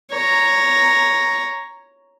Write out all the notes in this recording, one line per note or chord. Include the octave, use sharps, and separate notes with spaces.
C#5 A#5